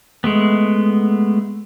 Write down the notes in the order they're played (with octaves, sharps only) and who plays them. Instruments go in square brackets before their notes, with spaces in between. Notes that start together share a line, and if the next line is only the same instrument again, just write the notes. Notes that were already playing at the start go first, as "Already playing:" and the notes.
[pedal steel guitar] G#3 A3 B3